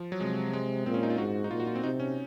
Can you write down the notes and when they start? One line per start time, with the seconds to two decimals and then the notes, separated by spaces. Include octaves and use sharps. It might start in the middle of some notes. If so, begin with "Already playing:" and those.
Already playing: F3
0.12 F#3
0.20 C3 G#3
0.53 G#3
0.86 A#2 C4
0.94 C#4
1.03 D#4
1.10 F4
1.18 G#2 F#4
1.44 D#4
1.51 A#2 F4
1.60 F#4
1.67 F4
1.75 C4
1.83 C3 D#4
2.00 C#4